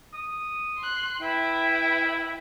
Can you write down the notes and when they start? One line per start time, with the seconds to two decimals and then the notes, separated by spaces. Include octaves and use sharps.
0.14 D#6
0.77 C6 F#6
1.21 E4 B4 E5 G5